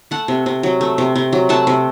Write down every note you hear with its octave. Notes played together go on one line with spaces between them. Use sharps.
A3 F#5 A5
C3
C3
F#3
A3
C3
C3
F#3
A3 F#5 A5
C3